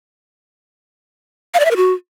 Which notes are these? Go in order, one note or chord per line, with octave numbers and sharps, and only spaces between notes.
F5
D5
E5
A#4
F#4